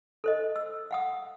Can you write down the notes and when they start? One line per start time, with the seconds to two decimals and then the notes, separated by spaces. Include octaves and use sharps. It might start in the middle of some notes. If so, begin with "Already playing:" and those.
0.24 A4 C5 D#5
0.56 E6
0.91 F5 F#5 D#6